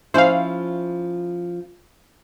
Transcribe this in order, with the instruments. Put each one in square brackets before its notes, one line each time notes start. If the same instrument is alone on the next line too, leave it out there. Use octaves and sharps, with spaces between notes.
[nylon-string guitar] F3 C#4 E4 [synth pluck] C5 F5